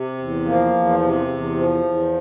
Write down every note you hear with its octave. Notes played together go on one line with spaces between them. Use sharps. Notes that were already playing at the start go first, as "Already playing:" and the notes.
Already playing: C3
E2
F3 A#3
E2
C3
E2
F3
E2